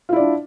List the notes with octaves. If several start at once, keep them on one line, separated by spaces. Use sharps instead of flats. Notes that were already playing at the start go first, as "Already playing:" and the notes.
D4 E4 F4 D5